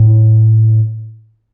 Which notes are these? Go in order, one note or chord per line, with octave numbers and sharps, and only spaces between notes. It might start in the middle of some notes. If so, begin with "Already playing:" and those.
Already playing: A2